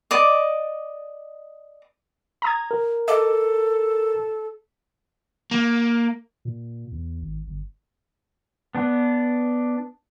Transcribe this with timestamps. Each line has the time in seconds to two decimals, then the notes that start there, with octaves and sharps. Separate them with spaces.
0.11 D5 D#5 D6
2.42 A#5 D#6 G#6
2.71 A#4
3.08 A4 D#5 D6
5.51 A#3
6.45 A#2
6.92 E2
7.22 G#1
7.47 G1
8.75 B3 D4